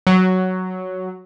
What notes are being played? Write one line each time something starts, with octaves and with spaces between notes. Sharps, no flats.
F#3